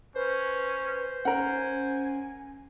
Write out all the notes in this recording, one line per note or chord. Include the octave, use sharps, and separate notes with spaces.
C#4 B4 C5
C#4 A#4 F#5 G#5